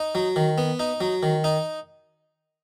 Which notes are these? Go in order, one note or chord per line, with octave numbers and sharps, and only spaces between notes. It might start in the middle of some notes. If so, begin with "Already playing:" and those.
Already playing: D#4
F#3
D#3
B3
D#4
F#3
D#3
D#4